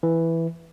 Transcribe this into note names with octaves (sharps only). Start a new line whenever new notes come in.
E3